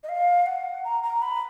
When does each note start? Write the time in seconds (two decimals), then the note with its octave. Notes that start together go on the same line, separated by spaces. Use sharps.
0.03 D#5
0.09 F5
0.46 F#5
0.84 A#5
1.03 A#5
1.22 B5